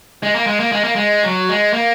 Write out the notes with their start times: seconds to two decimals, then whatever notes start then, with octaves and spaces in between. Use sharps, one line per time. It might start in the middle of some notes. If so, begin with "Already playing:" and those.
0.23 G#3
0.35 A#3
0.47 G#3
0.60 A#3
0.72 G#3
0.84 A#3
0.96 G#3
1.24 F#3
1.49 G#3
1.73 A#3